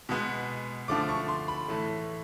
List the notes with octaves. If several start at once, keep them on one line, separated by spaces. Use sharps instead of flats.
B2 G#3 B3
D3 F3 A3 D6
C#6
C6
B5
A2 E3 A3